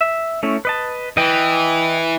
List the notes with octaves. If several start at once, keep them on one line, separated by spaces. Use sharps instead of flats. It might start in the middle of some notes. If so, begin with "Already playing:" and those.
E5
A3 C#4 E4
B4 D#5 A5
E3 D#5 G5